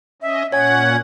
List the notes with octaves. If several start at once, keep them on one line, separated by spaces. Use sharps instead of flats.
C#4 D#5 E5
A#2 C#4 C#5 F#5 G#5 G#6